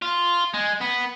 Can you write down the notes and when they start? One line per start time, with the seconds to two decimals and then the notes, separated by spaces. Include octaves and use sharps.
0.02 F4
0.54 G#3
0.81 B3